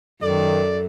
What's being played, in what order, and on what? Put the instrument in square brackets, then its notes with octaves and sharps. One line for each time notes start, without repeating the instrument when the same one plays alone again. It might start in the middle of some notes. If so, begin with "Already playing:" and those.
[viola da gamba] F#2 [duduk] D#3 [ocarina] A4 [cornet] D5